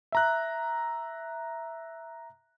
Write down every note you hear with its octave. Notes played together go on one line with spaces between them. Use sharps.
E5 A#5 F#6